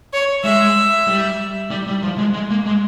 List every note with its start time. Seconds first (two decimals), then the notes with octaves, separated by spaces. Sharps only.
0.13 C#5
0.44 G#3 E5
1.08 G3
1.70 G3
1.87 G3
2.03 F3
2.18 G#3
2.34 G#3
2.50 A#3
2.66 G#3